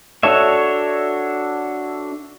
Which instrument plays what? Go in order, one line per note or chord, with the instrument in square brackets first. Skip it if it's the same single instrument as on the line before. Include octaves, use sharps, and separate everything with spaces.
[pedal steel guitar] D4 F#4 A4 C#5 E5